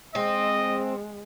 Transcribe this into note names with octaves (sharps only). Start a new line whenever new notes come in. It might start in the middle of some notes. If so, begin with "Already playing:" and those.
G#3 C4 D#5